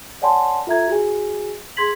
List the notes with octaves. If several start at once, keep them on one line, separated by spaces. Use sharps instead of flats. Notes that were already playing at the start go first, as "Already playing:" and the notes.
C#5 D5 F#5 G#5 A5 C6
F4 A4 E5 A#5 G#6
F#4 G#4 G#5
G#4 C6 G#6 B6 F#7